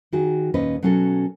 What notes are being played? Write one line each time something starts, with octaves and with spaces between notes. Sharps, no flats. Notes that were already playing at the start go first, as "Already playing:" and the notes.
D#3 F#4 G#4
D#2 A#2 C#4 B4 D#5
B2 F#3 C#4 F#4 A4